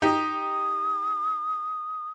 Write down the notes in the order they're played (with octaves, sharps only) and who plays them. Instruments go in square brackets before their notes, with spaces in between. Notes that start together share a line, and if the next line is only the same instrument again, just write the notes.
[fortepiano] D#4 G4 [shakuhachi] D#6